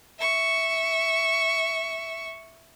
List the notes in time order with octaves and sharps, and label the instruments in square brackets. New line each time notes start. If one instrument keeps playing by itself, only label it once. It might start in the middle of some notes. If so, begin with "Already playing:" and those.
[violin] E5 C#6